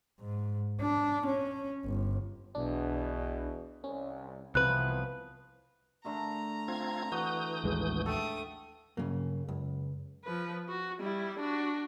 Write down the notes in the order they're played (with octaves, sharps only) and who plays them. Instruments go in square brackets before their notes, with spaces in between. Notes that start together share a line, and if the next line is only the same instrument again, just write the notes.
[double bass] G#2
D4
C#4
G1
[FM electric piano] B1 D4 [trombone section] E2 B2
[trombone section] C2 [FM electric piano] C#4
[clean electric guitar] C2 B4 [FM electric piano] C3 [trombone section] E3 F3 B3 [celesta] F#6
[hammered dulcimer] D3 A3 A#4 [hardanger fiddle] A#5
[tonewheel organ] C4 F4 G#6
[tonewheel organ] E3 D#6 G6 [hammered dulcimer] F#4
[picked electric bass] A1 D#2 G#3
[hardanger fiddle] A3 D#6 [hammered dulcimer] A4 G5
[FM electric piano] G2 F#3 [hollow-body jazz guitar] C#3 A#3
[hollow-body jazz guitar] C#2 [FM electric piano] F#2
[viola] F3 B4
F#4
G3 E4
D4 F#4